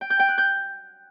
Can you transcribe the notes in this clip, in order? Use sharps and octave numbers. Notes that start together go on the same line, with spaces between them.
G5
G6
G5
F#6
G6